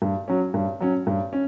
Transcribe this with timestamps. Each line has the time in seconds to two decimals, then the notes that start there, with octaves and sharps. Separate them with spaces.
0.02 G2
0.28 F#3 C#4
0.54 G2
0.80 F#3 C#4
1.07 G2
1.33 C#4